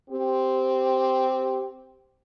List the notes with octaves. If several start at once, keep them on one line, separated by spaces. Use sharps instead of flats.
C4 G4